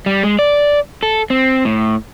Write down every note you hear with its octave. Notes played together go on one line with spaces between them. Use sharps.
G3
G#3
D5
A4
C4
A2